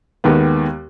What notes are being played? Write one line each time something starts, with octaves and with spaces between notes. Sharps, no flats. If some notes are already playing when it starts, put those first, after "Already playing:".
D#2 D#3 G#3 B3